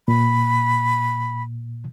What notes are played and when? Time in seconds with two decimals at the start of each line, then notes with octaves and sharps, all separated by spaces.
0.08 A#2 B5